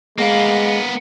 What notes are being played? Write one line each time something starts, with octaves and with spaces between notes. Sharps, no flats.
G#3 A#3 B3 F5 A#6